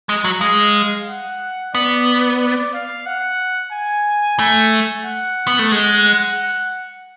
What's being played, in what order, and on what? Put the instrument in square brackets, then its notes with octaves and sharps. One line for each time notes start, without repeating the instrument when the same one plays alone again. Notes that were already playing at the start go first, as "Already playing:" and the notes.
[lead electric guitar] G#3
F#3
[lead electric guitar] G#3 [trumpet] F5
[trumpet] F#5
[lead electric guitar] B3 [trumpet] D5
[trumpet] D5
F5
F#5
G#5
[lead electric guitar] A3
[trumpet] F#5
[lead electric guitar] B3
A3
[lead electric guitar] G#3 [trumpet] F#5